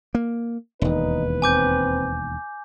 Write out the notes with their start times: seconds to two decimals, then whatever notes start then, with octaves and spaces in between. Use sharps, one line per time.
0.15 A#3
0.82 E1 D#2 D#4 B4
1.42 C4 G#5 D6 G6